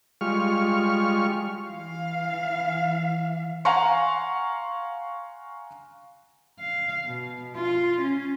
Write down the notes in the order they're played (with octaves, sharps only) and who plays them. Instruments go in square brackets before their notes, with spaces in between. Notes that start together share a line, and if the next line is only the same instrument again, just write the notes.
[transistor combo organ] G3 G#3 F4 C#6 F6
[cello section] E3 F5
[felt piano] F5 F#5 G#5 A#5 C6 C#6
[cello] F5
B2
F4
C#4